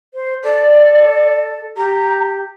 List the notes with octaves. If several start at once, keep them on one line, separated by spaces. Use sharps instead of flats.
C5
A4 D5
G4 A#5